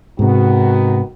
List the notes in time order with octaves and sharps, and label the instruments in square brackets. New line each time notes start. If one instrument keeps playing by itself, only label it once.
[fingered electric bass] G#2 C3 [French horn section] D#3 B3 F#4